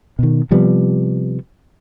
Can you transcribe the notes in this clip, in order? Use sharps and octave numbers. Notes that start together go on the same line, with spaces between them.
B2 D#3
C3 F3 G3 B3